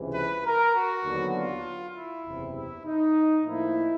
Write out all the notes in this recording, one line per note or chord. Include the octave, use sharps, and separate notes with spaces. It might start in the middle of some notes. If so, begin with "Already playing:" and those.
Already playing: C#2 C3 E3
B4
A#4
F#4
D#2 D3 F#3 B3 D4
F4
E4
F#1 E2 C3
E4
D#4
A2 F3 A#3 D#4 E4